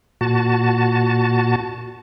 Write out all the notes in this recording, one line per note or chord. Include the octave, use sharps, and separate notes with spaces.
A#2 F#4 A5